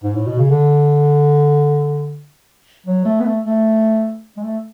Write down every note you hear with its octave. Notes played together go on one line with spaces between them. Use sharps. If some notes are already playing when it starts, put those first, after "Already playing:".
G#2
A2
B2
C#3
D3
F#3
A3
B3
A3
A3
G#3
A3